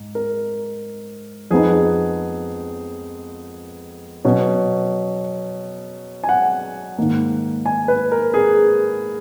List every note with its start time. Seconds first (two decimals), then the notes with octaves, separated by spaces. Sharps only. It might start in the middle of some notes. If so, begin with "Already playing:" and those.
Already playing: G#2
0.15 A#4
1.51 F2 F3 B3 D#4 G#4
4.25 B2 F#3 C#4
6.24 G#5
6.29 F#5
6.98 G#2 D#3 A#3
7.66 G#5
7.88 B4
8.12 A#4
8.34 G#4